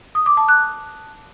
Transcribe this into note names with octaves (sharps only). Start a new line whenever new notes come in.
D#6
D6
A5
F#6